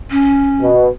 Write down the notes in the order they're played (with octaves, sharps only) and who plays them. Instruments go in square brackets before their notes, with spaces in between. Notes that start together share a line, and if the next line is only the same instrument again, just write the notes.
[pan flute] C#4
[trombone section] B2